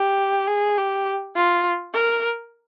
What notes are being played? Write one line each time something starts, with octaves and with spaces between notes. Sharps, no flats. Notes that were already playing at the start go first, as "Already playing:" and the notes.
Already playing: G4
G#4
G4
F4
A#4